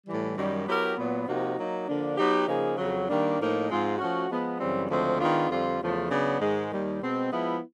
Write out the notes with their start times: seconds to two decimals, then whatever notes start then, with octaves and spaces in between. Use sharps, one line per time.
0.06 A2 E3 G3
0.36 F#2 D#3 G3
0.66 F#3 B3 E4 G4 A#4
0.96 A#2 F#3 B3
1.27 C3 F3 A#3 D#4 F#4
1.57 F#3 A#3 D#4
1.87 D3 F3 A#3 D4
2.17 F#3 B3 D#4 G4
2.47 C#3 F3 A#3 D#4 G#4
2.78 F2 C#3 F#3
3.08 D#3 G3 A#3 D4
3.39 A2 F3 A#3 D#4
3.68 G#2 F3 G#3 C4 F4
3.98 F3 A3 C#4 F#4
4.29 F3 G#3 B3
4.59 F#2 C#3 E3 G3 C4
4.89 D2 C#3 F3 G#3 C4
5.19 D#3 G#3 B3 D4 F4
5.49 F2 D3 G3 C4 F4
5.80 E2 C#3 F3 A3
6.09 C#3 F#3 B3 D4
6.40 G#2 D#3 G#3
6.71 D#2 D#3 G3
7.00 B2 G#3 C4
7.31 F3 G#3 B3 E4